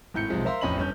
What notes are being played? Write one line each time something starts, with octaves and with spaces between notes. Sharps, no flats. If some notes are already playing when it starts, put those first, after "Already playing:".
G#1 A2 G6 C#7
B1 C3 F3 G#3
A#4 C5 E5 F5 A#5 C6
A1 F2 C#4 D#5 B5 F#7
G1 C#4 G6